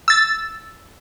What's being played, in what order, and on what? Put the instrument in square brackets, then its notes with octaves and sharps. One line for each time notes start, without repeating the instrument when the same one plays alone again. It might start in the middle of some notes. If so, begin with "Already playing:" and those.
[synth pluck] E6 A6